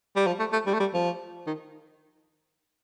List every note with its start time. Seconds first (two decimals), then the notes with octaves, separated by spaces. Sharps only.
0.16 G3
0.27 F3
0.40 A3
0.53 A3
0.66 G3
0.74 A3
0.80 G3
0.94 F3
1.47 D#3